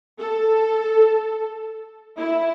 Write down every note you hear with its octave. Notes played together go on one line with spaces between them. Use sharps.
A4
E4